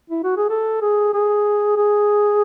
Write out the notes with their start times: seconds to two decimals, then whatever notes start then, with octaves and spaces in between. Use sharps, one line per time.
0.10 E4
0.24 F#4
0.37 G#4
0.49 A4
0.81 G#4
1.14 G#4
1.77 G#4